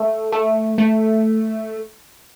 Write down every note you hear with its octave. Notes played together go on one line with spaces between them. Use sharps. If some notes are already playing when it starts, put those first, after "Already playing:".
Already playing: A3
A3
A3